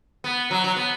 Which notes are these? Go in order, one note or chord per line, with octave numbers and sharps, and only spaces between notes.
B3
F#3
F#3
B3